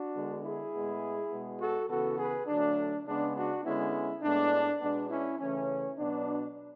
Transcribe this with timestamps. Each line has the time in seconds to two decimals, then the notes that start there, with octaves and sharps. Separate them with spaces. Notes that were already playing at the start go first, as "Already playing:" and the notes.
Already playing: D4 F#4
0.14 D3 G#3 B3
0.44 E4 G#4
0.73 A2 G#3 B3
1.31 B2 G#3 B3
1.60 F#4 A4
1.89 C#3 E3 B3 F#4 A4
2.18 G#4 B4
2.47 D3 F#3 A3 D4
3.06 C#3 G#3 B3 D4
3.35 D4 F#4
3.64 D3 G#3 B3 C#4 E4
4.22 A2 G#3 B3 D4
4.81 B2 G#3 B3 D4
5.10 C#4 E4
5.39 C#3 E3 A3 C#4
5.98 B2 F#3 B3 D4